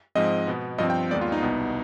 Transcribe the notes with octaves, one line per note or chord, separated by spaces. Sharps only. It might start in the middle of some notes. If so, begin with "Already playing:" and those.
G#2 F3 G#3 C4 D#5
B2 B3
G2 F3 C4 D#5
G5
D#2 D#3 G#3 B3 D5
F4
D#4
C2 B2 B3